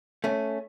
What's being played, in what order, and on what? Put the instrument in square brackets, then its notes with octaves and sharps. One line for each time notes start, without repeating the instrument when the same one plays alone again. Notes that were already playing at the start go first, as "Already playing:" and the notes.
[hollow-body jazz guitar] A3 C#4